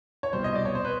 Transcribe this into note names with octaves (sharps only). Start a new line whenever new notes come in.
C#5
C2 B2 G3 C5
D#5
D5
C#5
C5
B4